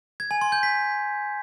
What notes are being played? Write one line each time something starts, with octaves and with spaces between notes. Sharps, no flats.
G#6
G#5
C6
G6
B6